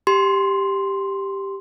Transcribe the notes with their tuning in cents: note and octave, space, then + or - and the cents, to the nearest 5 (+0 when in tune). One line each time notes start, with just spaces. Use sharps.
G4 +0 C6 +0